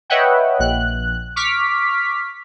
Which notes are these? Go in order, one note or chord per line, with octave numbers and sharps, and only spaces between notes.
B4 C#5 D#5 E5 F#5 G5
A#1 F#6
C#6 D6 F6 B6